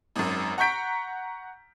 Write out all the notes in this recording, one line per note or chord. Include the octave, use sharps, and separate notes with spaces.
G#1 F#2
F#5 A#5 C#6 G6 B6 D7